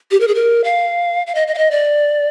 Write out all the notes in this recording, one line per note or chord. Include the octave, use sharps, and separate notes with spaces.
G4
A#4
G#4
A#4
F5
F5
D#5
D#5
F5
D#5
D5